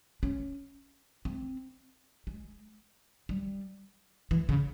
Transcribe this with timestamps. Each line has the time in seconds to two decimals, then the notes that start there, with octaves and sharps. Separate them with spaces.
0.23 C#4
1.25 C4
2.27 G#3
3.29 G3
4.31 E3
4.49 C#3